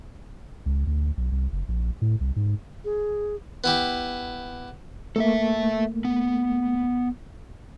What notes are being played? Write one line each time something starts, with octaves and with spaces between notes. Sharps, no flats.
C#2
D2
B1
C2
F#1
A#1
A2
C2
G#2
G#4
B3 E4 G4
A3 A#3 A4 E5
B3